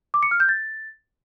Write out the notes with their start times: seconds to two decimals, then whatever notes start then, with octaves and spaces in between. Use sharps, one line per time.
0.14 D6
0.23 C#7
0.31 F6
0.40 G6
0.49 A6